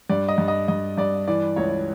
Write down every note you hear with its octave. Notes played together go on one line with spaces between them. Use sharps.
G2 D5
D#5
G2
D#5
G2 D#5
G2 D5
E3 D5
C#2 C#5